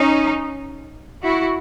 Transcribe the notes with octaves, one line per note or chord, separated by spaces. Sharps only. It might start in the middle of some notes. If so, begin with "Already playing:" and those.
Already playing: C#4 D#4
E4 F#4